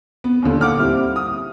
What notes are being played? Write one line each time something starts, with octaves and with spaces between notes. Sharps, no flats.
B3
D#2 A#2 D3
F#5 D6 F6
G3 C4 E4
D#6